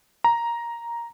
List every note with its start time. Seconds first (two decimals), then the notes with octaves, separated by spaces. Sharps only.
0.24 A#5